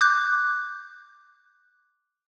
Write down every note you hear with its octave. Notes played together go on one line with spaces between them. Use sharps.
D6 F#6 G6